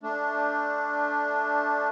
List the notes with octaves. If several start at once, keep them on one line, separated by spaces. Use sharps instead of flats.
A3 D4